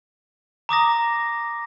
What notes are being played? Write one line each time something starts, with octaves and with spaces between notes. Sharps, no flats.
A#5 D6 D#6 A#6